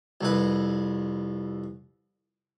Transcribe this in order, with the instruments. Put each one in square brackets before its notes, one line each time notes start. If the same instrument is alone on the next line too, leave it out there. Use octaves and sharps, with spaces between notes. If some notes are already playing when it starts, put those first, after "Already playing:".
[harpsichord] C2 F2 B4